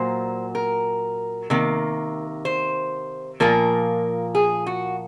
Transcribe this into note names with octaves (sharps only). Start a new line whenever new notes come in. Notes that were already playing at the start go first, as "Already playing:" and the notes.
Already playing: A#2 F#3 A#3 C5
A#4
C3 D#3 A#3
C5
A#2 F3 A#3 A#4
G#4
F#4